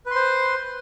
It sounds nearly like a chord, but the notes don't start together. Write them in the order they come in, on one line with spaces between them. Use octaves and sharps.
B4 C6 C5